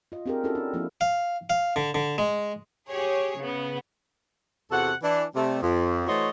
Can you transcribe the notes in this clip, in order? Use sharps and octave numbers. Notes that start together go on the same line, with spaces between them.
F4 D#5
C4 D4 G4 G#4 A#4
C#4 E4 F#4 A4
D4
F3 A#3 C4 D4 E4
F5
F5
D3
D3
G#3
G4 G#4 C#5
C#3 B3
E2 C3 F#4 A4 F#5
E3 D4
C3 G3 A3
F2
E3 A3 F#4 C5 C#5 D#5